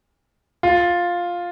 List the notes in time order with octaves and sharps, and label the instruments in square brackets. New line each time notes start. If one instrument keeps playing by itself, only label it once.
[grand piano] F4